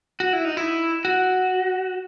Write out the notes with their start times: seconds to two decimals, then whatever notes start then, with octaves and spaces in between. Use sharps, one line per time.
0.20 F#4
0.33 E4
0.45 D#4
0.57 E4
1.05 F#4